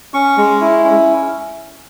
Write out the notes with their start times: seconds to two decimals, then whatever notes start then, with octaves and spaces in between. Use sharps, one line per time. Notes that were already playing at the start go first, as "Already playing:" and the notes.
0.14 C#4 C#6
0.38 G#3
0.61 E4
0.85 C#4